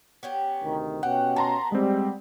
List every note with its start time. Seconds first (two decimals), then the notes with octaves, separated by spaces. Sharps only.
0.23 B3 C#4 G4
0.62 D2 C3 D#3
1.03 B2 C#4 G4 F#5
1.36 B3 A5 A#5 C6
1.72 G3 G#3 C4